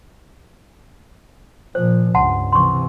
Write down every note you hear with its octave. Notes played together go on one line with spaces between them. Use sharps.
A#2 F3 C5
C#2 G2 F#5 A5 C6
C3 E3 C6 C#6